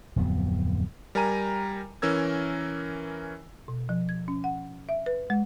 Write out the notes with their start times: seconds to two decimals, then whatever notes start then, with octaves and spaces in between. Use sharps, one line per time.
0.16 D1 F2 F#3 B3
1.15 G3 A#4 G5 G#5 A#5 D#7
2.02 E3 C#4 A#4 E6 G#6
3.68 B2
3.89 F3
4.09 G#6
4.28 C#4
4.44 F#5
4.89 E5
5.06 B4
5.30 G#3